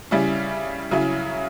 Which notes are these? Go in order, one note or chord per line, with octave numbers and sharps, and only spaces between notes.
C#3 G3 C#4 E4
C#3 F#3 C#4 E4